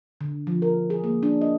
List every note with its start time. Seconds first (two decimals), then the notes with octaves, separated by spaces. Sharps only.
0.21 D3
0.47 F3
0.62 A#4
0.90 G#4
1.04 A#3
1.23 D4
1.41 D#5